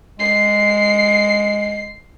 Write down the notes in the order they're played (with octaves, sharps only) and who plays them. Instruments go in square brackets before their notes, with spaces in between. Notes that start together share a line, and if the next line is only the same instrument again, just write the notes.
[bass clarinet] G#3 [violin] C7